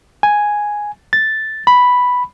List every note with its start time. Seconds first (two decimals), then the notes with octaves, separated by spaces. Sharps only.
0.23 G#5
1.13 A6
1.67 B5